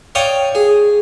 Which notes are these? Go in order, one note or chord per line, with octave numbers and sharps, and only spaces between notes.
C#5 D5 F5 G5 D6 D#6
G#4